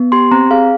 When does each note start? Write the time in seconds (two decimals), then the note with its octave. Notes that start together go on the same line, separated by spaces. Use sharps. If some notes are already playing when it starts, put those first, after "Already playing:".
Already playing: B3
0.12 G4 C6
0.31 C4 A#5
0.51 G#4 F5